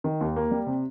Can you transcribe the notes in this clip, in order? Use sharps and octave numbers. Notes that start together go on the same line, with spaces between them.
D#3
D#2
A#3
G3
C3